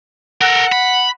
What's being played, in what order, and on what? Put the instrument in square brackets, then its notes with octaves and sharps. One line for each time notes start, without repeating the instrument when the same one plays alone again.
[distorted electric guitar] A4 A#4 [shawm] F#5
[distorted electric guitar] B5